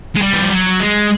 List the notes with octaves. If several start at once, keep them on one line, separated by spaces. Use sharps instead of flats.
G#3
G3
E3
F3
F#3
G#3